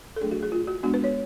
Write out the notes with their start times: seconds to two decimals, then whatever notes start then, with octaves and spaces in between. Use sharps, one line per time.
0.16 A4
0.21 F#3 A3 D4 G#4
0.31 F#4
0.43 G#4
0.52 F4
0.67 F#4
0.83 G#3 B3 D4 F#4
0.94 B4
1.04 C#5